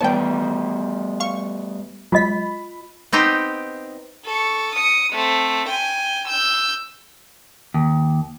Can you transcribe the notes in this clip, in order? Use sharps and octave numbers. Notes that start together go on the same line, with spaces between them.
G3 A3 B3 C#5 G5 A5
F5 C#6
F#3 G#3 F4 D#5 B5 B6
B3 C4 D#4 G4
A4 C#6
D#6 C#7
A3 C4
G5 G#5
E6 G6
D#2